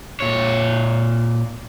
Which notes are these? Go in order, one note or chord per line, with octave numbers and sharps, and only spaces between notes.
A#2 C#5